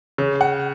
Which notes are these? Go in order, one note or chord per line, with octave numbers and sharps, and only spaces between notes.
C#3
F#5